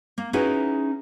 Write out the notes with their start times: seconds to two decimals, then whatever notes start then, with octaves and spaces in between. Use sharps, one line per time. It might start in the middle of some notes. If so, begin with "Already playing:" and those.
0.18 A#3
0.33 C#4 D#4 E4 F#4 G#4 B4